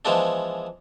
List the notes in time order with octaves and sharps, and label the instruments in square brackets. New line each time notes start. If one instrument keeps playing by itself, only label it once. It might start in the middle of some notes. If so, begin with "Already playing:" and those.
[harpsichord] E3 F3 G#3 B3 D4